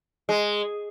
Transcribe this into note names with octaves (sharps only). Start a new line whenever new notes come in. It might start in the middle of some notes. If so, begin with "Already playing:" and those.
G#3